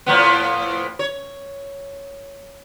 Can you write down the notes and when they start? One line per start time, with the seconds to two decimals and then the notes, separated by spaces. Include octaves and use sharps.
0.06 A2 F3 B3
0.99 C#5